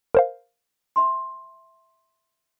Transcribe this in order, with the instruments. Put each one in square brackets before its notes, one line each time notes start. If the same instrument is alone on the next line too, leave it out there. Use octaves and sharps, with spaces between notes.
[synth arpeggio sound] A#4 C5 F5
[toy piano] E5 B5 C6